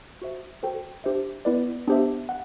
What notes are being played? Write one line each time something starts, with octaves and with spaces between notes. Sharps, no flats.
F#4 C5 E5
F#4 A4 C5 G5
D4 G4 C5 E5
B3 E4 B4 D5
B3 D4 G4 C5 E5
F#5